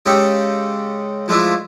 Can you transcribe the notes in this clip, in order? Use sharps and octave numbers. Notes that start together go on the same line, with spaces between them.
C#3 G#3 D#4 G4 A4
F3 G#3 A3 D4 E4